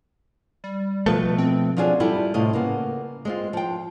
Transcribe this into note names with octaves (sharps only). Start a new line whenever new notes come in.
G3
B2 F3 A3 B4
C4
F3 F#3 D4 F4 G#4 E5
G3 E4 F4 G4 A4
A2 C3 F4 D#5
C#3 A#3 B3
G#3 C4 F4
F3 G5